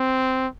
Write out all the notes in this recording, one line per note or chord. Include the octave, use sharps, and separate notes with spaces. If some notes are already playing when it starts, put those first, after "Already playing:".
Already playing: C4